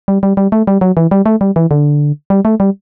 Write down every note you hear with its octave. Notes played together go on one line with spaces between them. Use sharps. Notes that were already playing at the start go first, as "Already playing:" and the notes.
G3
G3
G3
A3
G3
F#3
E3
G3
A3
G3
E3
D3
G3
A3
G3